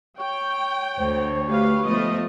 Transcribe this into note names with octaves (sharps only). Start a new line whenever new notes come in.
C#5 G5
D2 C5
A3 G4 B4 F5
F3 A3 B3 D#5